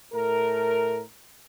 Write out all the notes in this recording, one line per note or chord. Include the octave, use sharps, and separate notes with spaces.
A2 A3 A#4